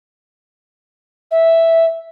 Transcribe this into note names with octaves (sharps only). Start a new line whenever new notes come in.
E5